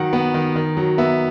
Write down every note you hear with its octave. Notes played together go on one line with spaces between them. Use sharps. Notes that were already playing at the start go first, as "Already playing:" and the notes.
Already playing: D#3 F#3 F#5
B3 F#5
D#3
D#3
F#3
B3 E5